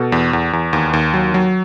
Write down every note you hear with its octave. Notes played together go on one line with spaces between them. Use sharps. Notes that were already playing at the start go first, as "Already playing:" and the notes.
Already playing: B2 A4
E2
E2
E2
D#2
D#2
F#3
F#3